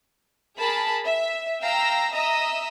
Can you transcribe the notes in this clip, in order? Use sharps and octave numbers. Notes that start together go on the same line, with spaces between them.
G#4 A#4 A5 B5
E5
F5 G5 A#5 E6
D#5 E5 A#5 D#6 E6